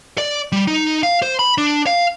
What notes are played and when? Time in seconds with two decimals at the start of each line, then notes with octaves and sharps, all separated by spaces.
0.18 D5
0.52 G3
0.67 D#4
1.03 F5
1.22 C5
1.39 B5
1.58 D4
1.87 F5